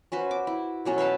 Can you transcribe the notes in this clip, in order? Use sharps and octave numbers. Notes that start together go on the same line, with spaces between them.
C#4 F#4 B4 C5
D6
E4
B2 F#3 C#4 A4
B4 E5 F5 A5